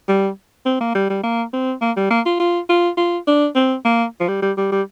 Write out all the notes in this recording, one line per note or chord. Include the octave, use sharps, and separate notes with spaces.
G3
C4
A#3
G3
G3
A#3
C4
A#3
G3
A#3
F4
F4
F4
F4
D4
C4
A#3
F3
G3
G3
G3
G3